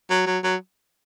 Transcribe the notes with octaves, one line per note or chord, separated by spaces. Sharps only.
F#3
F#3
F#3